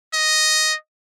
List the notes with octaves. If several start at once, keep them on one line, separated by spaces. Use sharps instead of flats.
D#5